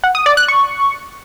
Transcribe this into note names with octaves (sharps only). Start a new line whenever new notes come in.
F#5
D#6
D5
F#6
C#6